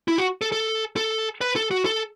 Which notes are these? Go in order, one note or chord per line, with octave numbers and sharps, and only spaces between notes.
E4
F#4
A4
A4
A4
B4
A4
F#4
A4